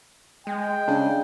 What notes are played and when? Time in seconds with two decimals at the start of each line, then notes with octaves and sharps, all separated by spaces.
0.47 G#3 G5
0.88 C#3 D4